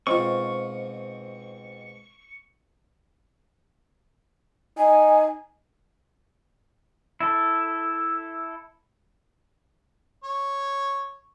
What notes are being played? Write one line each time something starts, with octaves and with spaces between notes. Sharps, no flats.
G#2 B2 C4 F4 C#6
D#4 G#5
E4 A4
C#5